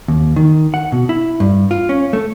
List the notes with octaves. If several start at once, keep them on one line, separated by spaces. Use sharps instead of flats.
D#2
D#3
F#5
B2
E4
G2
F4
C#4
A3